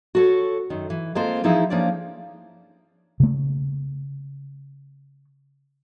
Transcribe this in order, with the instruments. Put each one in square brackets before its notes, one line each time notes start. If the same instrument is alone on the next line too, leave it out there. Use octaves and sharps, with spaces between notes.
[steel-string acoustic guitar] F#4 A4 C#5
F#2 D#3
E3
G#3 A#3 C4 F4 A4 C5
E3 F3 D#4 E4 G#4 E5
F3 A#3 C#4 D4 D5
[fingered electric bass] C#3 A3